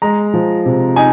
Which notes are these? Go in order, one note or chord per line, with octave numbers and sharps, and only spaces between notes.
G#3 A#5
F3
C3
D#4 G#5